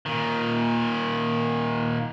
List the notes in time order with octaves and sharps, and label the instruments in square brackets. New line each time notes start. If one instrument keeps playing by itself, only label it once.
[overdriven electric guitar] A#2 D#3